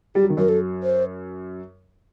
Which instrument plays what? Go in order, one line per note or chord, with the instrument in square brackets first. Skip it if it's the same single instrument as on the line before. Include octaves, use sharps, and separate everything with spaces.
[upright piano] G3 [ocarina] G4
[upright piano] F#3
D#3
[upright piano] F#2 F#3 [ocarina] A#4
[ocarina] A4
C5